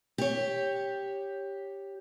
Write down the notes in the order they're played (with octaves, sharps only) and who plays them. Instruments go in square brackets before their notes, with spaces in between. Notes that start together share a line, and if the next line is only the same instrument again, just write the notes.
[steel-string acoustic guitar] G4 C#5